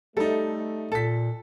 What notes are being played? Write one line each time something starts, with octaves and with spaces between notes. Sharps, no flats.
G3 A3 D#4 A4
A#2 A4 A5 B6